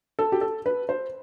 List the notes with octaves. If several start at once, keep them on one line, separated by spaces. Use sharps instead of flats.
A4
G4
A4
B4
C5